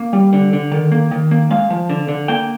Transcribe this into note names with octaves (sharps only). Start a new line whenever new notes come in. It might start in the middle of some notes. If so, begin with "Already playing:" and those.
Already playing: A#3
G3
D3
D3
D#3
A#3
D#3
A#3
G#3 F5
F3
D3
D3
A#3 G5